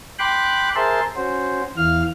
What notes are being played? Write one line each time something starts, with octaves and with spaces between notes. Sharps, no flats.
G5 B5 C6 D6 F#6
G#4 A#4 C5 E5 A5 C6
C#4 F#4 C5
E2 E3 F5 F6